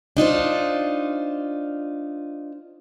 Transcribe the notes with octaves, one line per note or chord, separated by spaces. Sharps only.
D4 D#4 F4 C5